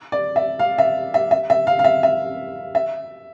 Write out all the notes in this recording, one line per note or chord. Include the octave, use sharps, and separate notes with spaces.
D5
E5
F5
E5
E5
E5
E5
F5
F5
E5
E5
E5